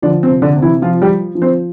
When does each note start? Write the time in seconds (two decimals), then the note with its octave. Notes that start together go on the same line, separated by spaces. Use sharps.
0.02 D3 F3 D4
0.23 C4
0.29 C3
0.42 D3 D4
0.56 C3
0.62 E3 E4
0.82 F3 F4
1.02 G3 G4
1.09 F3
1.35 F3
1.42 C4 C5